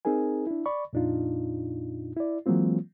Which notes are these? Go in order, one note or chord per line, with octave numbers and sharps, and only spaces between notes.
C4 D#4 G#4 A#4 G#5
D4 E4
D5 B5 C#6
F2 A#2 D4 D#4 F4
E4 D5
E3 F#3 G#3 A#3 C4 F4